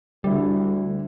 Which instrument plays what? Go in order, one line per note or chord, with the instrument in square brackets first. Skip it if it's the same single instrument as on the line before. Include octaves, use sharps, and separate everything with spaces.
[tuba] D2 [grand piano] D3 E4 [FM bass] G3